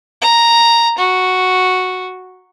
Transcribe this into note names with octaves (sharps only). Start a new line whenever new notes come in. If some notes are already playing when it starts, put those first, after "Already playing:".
A#5
F#4